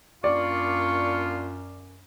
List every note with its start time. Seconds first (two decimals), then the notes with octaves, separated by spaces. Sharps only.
0.24 F#2 A#3 D4 F4 D5 C#6